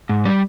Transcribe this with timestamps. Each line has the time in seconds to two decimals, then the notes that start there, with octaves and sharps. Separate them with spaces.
0.09 G#2
0.25 G3